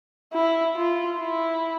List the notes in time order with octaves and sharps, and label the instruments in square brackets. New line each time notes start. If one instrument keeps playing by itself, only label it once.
[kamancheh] E4
F4
E4